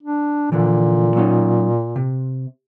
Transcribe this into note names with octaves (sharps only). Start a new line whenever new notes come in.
D4
A#2 D3 E3 F3
F#3 C#4 D#4
C3